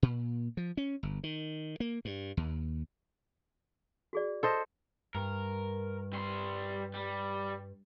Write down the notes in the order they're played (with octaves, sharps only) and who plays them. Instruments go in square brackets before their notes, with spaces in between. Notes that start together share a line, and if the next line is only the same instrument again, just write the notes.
[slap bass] A#2
F3
C#4
G1
D#3
A#3
G2
D#2
[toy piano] F#4 G#4 D5
[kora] A4 C5 D#5
[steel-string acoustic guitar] G2 [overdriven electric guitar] A#4
[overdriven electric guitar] G3 C6
G3